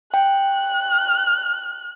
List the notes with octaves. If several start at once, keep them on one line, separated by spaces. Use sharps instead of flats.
G5 F#6